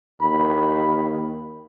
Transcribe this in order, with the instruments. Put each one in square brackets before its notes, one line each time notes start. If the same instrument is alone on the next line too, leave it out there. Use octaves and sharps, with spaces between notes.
[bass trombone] D#2 [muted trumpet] B5